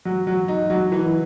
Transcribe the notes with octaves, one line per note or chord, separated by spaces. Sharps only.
F#3
F#3
D#4
F#3
E3